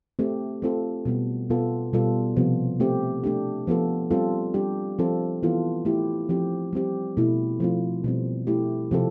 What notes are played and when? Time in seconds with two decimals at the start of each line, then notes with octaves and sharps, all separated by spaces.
0.19 A3 C4 G4
0.62 A3 C4 F4 A4
1.05 B2 G3 B3
1.50 B2 B3 F4 A4
1.93 B2 G3 B3 F4 A4
2.36 C3 F3 B3 F4
2.80 A3 C4 G4
3.24 A3 D4 G4
3.67 F3 B3 F4 A4
4.11 G3 C4 F4 A4
4.54 G3 D4 G4
4.99 F3 C4 F4 A4
5.43 E3 B3 F4 A4
5.85 A3 E4 G4
6.29 F3 C4 G4
6.73 G3 C4 G4
7.17 B2 A3 E4
7.60 F3 A3 C4 F4
8.04 B2 G3 C4
8.47 A3 E4 G4
8.91 C3 F3 C4 F4 A4